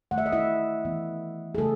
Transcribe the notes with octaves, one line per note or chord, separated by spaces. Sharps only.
D#3 A3 F#5
E5
D#5
E4 E5
E3 B3
G#4
C#3 G#3 A3 A4